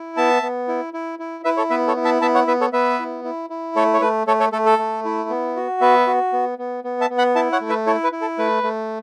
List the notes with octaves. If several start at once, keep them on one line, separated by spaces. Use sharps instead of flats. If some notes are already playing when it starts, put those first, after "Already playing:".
Already playing: E4
B3 E5 A5
B3
E4
E4
E4
E4 B4 E5
A4 C#5
B3 B4 E5
A4 C#5
E4
E5 A5
B3 E5 A5
C#5 F#5
B3 B4 E5
A4 C#5
B3 B4 E5
E4
E4
E4
A3 A4 C#5
C#5
A3 B4
A3 A4 C#5
A4 C#5
A3 A4
A4
A3
E4
B3
F#4
B3 B4 E5
F#4
B3
B3
B3
E5 A5
B3
F#5 B5
E4 E5 A5
C#5 F#5
A3
B4 E5
E4 A4 C#5
B4
E4
A4
A3 B4
A3